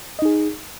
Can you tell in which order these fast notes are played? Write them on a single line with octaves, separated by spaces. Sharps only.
D#5 D#4 G#4